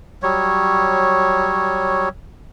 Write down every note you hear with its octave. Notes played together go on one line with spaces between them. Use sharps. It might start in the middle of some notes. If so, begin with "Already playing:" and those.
F#3 G3 C#5